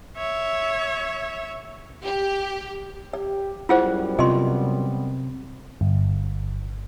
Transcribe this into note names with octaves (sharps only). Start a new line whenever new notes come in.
C#5 E5
G4
G4 D5
F#2 G3 B3 E4 F4 G#4 C5 F#5
C3 F4 D#5 C6
G1